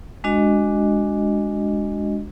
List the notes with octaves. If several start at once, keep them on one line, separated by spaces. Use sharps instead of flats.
G#3 D4 F#4 D#5